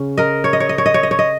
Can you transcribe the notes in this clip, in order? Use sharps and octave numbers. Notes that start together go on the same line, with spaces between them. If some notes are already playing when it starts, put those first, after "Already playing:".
Already playing: C#3 C#4
A#4 D#5
C#5
D#5
C#5
D#5
C#5
D#5
C#5
D#5
C#5
D#5